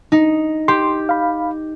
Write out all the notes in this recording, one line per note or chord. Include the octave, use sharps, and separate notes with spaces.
D#4
G4 C6
F5 B5